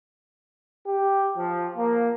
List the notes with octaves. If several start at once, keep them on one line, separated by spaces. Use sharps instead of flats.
G4
F3
A#3